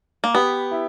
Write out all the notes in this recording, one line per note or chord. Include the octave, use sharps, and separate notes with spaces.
A#3
B3 G4
E4